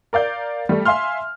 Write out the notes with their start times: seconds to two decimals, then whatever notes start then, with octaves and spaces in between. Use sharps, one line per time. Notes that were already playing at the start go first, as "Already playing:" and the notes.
0.13 A#4 D5 F5 G6
0.69 G3 A3
0.85 E5 F5 G#5 C6 F6